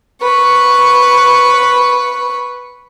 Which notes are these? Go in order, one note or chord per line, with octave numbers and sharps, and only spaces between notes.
B4 C#6